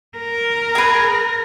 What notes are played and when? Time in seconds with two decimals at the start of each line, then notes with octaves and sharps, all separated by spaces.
0.18 A#4
0.75 G#4 B4